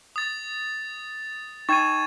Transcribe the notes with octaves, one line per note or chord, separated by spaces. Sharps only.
D#6 A6
D#4 G5 C#6 G#6 A6 D#7 E7